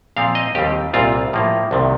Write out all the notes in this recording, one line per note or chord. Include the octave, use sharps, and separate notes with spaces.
A#2 F3 C4 F5
D#5
D#2 D#3 G3 C4 G4
C2 A#2 G3 C4 F4
A2 F3 A#3
C2 C3 D#3